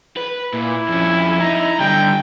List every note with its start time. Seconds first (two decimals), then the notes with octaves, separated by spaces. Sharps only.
0.17 B4
0.53 A#2 E4
0.88 F2 C#4
1.40 D#4 E4 A#5
1.80 D3 G3 G5